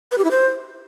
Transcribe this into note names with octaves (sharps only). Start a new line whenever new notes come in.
B4
G4
E4
C5